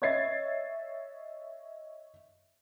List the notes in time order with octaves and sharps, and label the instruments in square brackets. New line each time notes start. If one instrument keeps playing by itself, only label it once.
[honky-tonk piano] C#5 D#5 E5 G#6 A6 C7